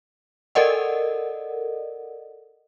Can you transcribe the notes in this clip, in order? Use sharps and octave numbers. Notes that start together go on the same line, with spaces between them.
A4 A#4 D5 D#5 F#5